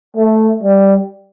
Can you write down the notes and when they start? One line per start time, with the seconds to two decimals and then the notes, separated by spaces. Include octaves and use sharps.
0.17 A3
0.63 G3